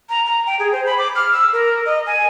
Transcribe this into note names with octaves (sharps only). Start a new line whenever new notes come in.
A#5
A#5
G5
G#4
C5
B5
D6
F6
E6
A#4
D#5
G#5